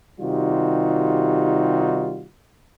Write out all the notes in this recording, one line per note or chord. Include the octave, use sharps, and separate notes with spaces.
C3 D#3 G3 D#4 F4 F#4